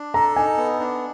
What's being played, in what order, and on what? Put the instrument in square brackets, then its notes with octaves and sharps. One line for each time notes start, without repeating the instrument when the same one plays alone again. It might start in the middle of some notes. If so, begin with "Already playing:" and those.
Already playing: [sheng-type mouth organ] D4
[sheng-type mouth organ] A4 [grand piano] A#5
[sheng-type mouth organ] D#4 [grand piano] G#5
[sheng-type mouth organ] B3
D4